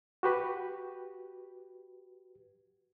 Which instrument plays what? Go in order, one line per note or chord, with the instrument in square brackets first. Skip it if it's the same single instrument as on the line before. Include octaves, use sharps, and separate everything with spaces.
[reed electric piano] F#4 G4 B4